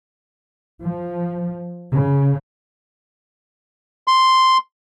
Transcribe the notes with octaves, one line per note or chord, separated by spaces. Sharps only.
F3
C#3
C6